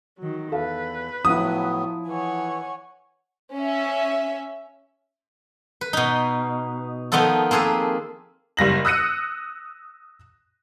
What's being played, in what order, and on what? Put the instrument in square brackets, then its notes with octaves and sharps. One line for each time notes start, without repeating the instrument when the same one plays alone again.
[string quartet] D#3 F#3
[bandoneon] E2 [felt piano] A4 F5 [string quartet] B4
[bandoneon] A2 F#3 B3 [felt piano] F3 E4 [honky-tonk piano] D#6
[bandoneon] E3 [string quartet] C#5 F#5 G#5
[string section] C#4 E5
[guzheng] B4
B2 D#4
D#3 F3 B3 D#4 F4 A4
A#3 C4 G#4 A4 B4
[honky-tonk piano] F#1 G3 A#6 F#7
D#6 E6 F#6 A#6 C#7 D#7